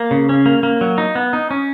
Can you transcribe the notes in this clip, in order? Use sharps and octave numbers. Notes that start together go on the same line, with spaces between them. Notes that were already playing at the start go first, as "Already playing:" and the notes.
Already playing: A#3
C#3
C#4
A#3
A#3
F#3
D#4
B3
D#4
C#4